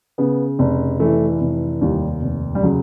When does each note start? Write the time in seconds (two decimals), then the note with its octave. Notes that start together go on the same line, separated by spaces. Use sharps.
0.18 C#3 B3
0.59 F1
1.00 E3 A3
1.41 F1
1.81 D#2 G3
2.22 F1
2.55 G3
2.63 C#3 F#3